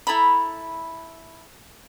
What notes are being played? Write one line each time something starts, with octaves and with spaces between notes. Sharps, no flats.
E4 A4 A#5 B5